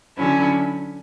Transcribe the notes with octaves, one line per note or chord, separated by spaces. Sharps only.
D3 F#3 C#4 E4